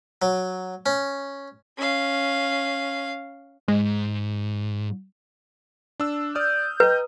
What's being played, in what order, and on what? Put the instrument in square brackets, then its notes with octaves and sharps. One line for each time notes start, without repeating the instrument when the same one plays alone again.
[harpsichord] F#3
C#4
[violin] C#4 F5
[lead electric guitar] G#2 [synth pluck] G#3
[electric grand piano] D4 E6
[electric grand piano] D5 D#6 F6 [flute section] G6
[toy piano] B4 [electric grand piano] D#5 G5 A#5